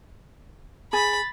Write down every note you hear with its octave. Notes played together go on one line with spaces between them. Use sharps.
G#4 B5 A6